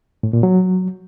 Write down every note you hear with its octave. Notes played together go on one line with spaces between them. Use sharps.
A2
A#2
F#3